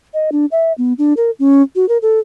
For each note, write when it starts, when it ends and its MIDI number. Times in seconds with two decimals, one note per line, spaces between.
0.14 0.30 75
0.32 0.46 62
0.52 0.73 76
0.78 0.93 59
0.98 1.13 62
1.17 1.31 70
1.39 1.62 61
1.76 1.88 66
1.89 1.98 70
2.02 2.19 69